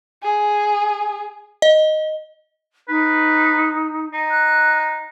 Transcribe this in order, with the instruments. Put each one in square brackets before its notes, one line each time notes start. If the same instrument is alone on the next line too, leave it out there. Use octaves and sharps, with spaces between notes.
[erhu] G#4
[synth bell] D#5
[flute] D#4 [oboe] B4
[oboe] D#4
[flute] F#6